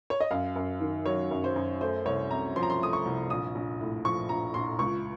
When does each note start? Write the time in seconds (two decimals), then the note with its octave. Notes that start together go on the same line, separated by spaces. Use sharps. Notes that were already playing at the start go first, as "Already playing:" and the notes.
0.10 C#5
0.20 D#5
0.31 F#2 F5
0.56 F#2
0.81 D#3
1.05 F#3 C#5
1.31 F#2
1.44 C5
1.56 F#2
1.81 A3 C5
2.06 C2 C#5
2.31 C3 A#5
2.56 F3 C6
2.63 A#5
2.70 C6
2.81 A3 D#6
2.93 C#6
3.05 C2
3.30 A#1 D#6
3.55 A#1
3.81 A2
4.05 F3 C#6
4.29 A#1 A#5
4.54 A#1 C6
4.79 C#2 C#6